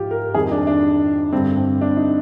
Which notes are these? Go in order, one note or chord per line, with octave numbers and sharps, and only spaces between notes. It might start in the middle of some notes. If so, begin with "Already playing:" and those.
Already playing: G#2 F3 F4 G4
A#4
F2 D#3 G3 G#4
D4
D4
G2 D3 G3 C4
C4
D4
D#4